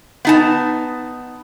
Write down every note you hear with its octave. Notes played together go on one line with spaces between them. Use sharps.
B3 D#4 A5